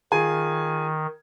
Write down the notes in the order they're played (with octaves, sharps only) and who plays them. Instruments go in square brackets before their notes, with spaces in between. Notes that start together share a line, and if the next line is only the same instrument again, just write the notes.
[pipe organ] D#3 [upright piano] F4 G#4 G#5